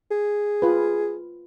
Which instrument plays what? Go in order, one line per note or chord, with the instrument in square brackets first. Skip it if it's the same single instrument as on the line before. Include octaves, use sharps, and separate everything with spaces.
[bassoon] G#4
[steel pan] F4 B4